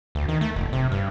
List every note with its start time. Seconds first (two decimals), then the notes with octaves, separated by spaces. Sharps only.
0.15 D2
0.29 D#3
0.41 A3
0.56 F1
0.73 C3
0.92 G2